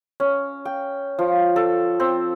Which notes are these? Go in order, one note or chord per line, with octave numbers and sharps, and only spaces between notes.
C#4
G5
F3
A4
C4